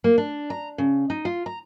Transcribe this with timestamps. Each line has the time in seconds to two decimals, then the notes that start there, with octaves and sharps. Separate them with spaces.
0.04 A#3
0.18 D4
0.50 A#5
0.78 C#3
1.10 D#4
1.25 F4
1.46 A#5